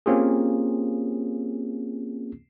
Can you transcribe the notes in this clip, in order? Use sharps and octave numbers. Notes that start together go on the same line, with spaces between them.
A#3 C4 C#4 F4 G4 G#4